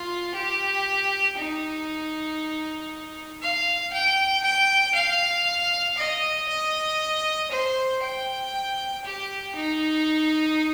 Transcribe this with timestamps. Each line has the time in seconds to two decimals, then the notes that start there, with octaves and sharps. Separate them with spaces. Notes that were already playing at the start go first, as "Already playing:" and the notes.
Already playing: F4
0.35 G4
1.38 D#4
3.42 F5
3.93 G5
4.44 G5
4.95 F5
5.98 D#5
6.48 D#5
7.51 C5
8.03 G5
9.05 G4
9.55 D#4